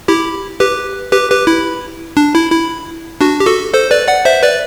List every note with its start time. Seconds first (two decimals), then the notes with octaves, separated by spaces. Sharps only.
0.08 E4 G4
0.60 G4 B4
1.12 G4 B4
1.30 G4 B4
1.47 E4
2.17 D4
2.35 E4
2.51 E4
3.21 D4 F#4
3.40 G4
3.47 F#4 A4
3.74 A4 C5
3.91 B4 D5
4.08 D5 F#5
4.25 C5 E5
4.43 B4 D5